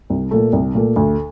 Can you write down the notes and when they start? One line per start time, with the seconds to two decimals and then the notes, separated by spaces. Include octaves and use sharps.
0.10 C2
0.31 A#2 A3
0.53 C2
0.75 A#2 A3
0.96 D2